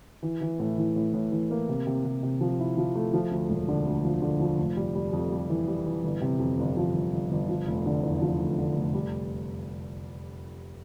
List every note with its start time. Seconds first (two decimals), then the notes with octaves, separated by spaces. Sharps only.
0.23 E3
0.41 E3
0.60 A2
0.78 E3
0.96 A2
1.14 A2
1.32 E3
1.51 A#3
1.69 C3
1.87 C3
2.04 C3
2.23 C3
2.41 F3
2.60 E4
2.77 F3
2.95 A3
3.14 F3
3.31 D2
3.50 E1
3.68 D3
3.86 D2
4.05 F3
4.22 D3
4.40 F3
4.58 F1
4.77 G3
4.95 G3
5.13 F2
5.31 G3
5.50 E3
5.68 G3
5.86 E3
6.04 G1
6.21 C3
6.40 F2
6.59 G1
6.77 F3
6.94 G1
7.13 G1
7.31 G1
7.49 F3
7.67 F1
7.86 D3
8.03 E2
8.22 F3
8.39 F1
8.58 D3
8.76 F1
8.94 G3